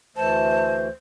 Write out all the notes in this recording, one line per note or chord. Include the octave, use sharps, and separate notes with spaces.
D2 E3 A3 C5 A5